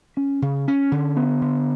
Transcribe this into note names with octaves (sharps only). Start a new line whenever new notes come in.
C#4
C#3
C#4
D3
B3
D3